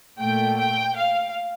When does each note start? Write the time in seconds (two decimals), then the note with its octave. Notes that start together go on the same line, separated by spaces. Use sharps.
0.19 A#2 A3 G5
0.57 G5
0.95 F5